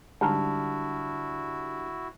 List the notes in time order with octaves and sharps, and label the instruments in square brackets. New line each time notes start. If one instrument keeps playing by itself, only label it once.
[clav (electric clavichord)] G#2 [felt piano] D3 G3 F6 [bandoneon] E4 F#4 [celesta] A5